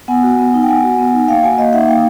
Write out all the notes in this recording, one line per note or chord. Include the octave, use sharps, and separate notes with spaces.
B3 F#5 G#5
F#4
B3
D#4
G5
B3 F#5 G#5
F#4
B3
D#4
A#3 F5 G5
F#4 F#5 G#5
A#3 D#5 F5
D#4 E5 F#5
A#3 F5 G5